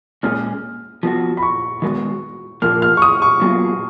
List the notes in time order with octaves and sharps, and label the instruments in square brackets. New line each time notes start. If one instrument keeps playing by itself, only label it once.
[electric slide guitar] A#2 G#3 C#4 G#4 [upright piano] F6
[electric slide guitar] F3 B3 F#4
[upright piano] B5
C#6
[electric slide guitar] D#3 G#3 B3 F#4
[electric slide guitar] A#2 F3 A#3 [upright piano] F6
[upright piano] F6
C#6
D#6
C#6
[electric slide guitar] A#2 F#3 B3 F4 G#4